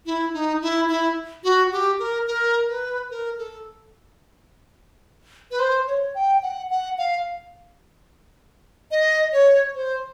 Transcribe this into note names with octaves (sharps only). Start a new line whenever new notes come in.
E4
D#4
E4
E4
F#4
G4
A#4
A#4
B4
A#4
A4
B4
C5
C#5
G5
F#5
F#5
F5
D#5
C#5
C5